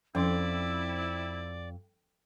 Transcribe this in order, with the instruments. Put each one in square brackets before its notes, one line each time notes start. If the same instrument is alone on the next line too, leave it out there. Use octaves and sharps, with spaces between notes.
[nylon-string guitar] F2 [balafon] F3 C#4 [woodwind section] C4 E4 [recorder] D5